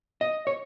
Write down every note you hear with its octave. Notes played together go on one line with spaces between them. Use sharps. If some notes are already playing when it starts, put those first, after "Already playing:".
D#5
C#5